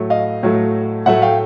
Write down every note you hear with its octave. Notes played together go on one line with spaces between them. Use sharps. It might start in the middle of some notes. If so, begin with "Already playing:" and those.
Already playing: A2 F#3 A3
D#5 F5
A2 F#3 A3
A2 F#3 A3 E5 F#5
F5 G5